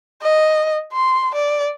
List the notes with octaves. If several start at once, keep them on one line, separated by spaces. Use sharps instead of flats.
D#5
C6
D5